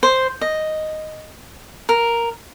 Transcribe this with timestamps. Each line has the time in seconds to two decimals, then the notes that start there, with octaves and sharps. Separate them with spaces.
0.03 C5
0.41 D#5
1.89 A#4